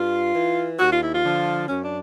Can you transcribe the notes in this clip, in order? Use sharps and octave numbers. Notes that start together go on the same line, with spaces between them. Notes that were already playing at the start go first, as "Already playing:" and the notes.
Already playing: G2 F4
E3
D#2 F#4
F4
E4
F4
D3 F3
F#2 C#4
D4